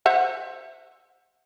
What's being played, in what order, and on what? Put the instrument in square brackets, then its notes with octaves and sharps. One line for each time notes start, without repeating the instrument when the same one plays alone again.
[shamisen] C5 E5 F#5